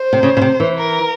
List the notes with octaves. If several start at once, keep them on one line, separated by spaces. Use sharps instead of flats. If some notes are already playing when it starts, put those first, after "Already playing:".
Already playing: C5
C3
C#3
C#3
C3
E3
A#4